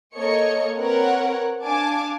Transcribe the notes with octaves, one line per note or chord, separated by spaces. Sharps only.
A#3 A4 C#5 D#5 C#7
C4 A#4 B4 C#5 F#5
D4 F5 G#5 A5 D6